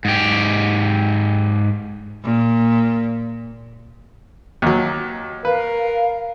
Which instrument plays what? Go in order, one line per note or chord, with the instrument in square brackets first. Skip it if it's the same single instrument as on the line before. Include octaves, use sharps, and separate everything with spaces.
[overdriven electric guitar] G#2 G4
[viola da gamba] A#2
[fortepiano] D#2 F#3
[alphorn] A#4 [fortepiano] B4 [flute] F5